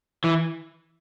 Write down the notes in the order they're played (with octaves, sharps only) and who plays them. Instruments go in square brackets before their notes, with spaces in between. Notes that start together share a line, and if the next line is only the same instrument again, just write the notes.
[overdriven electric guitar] E3